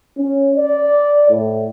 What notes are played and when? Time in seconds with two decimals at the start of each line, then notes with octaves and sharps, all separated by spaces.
0.16 C#4
0.55 D5
1.29 A2